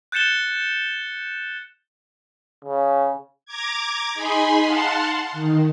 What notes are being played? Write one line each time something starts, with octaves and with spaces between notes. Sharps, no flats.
F#6 G6 A6 C#7 E7 G7
C#3
A#5 D6 G#6
D#4 G#4 G#5 B5 C6
F5 F#5 A5 C6
D#3